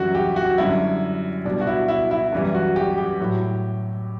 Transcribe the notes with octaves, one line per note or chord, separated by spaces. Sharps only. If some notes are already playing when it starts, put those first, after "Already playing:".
Already playing: F#2 E3 G3 E4 F#4
G4
F#4
F#2 D3 G3 E4
B2 G3 D4
F#4
E4
E4
E4
F#2 E3 G3
F#4
G4
G4
A2 F#3